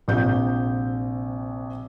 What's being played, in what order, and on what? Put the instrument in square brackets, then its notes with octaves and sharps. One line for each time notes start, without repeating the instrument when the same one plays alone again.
[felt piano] A#1 C3 G6